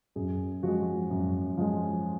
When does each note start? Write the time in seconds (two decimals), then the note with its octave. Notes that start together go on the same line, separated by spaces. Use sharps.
0.16 F#2 G#4
0.63 F3 G#3 F#4
1.10 F#2
1.57 F3 G#3